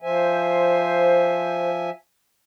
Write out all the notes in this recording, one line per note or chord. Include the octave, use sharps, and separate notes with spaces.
F3 C5 E5 G#5